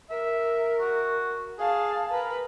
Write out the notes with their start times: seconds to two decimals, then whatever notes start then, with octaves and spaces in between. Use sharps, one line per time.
0.10 A#4 E5
0.80 F#4
1.59 G#4 F5 A5
2.12 A#4 B4